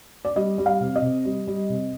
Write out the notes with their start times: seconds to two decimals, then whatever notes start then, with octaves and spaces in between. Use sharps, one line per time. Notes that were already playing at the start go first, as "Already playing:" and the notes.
0.25 D5
0.36 G3 D#5
0.58 G3
0.66 F5
0.80 C3
0.96 D#5
1.02 C3
1.25 G3
1.47 G3
1.69 C3